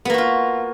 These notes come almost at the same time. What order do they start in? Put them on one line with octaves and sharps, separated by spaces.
B3 A#3 F#4 F4